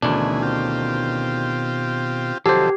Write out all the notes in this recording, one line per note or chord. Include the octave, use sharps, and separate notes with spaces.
D2 B2 D#3 E3 C#4 D4 G#4
C4 F4 G4
C3 D#3 F3 F#3 G4 A4 C5